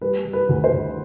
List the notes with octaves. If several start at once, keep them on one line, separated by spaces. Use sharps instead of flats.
G3 B4
G3
B4
D2
C5
D2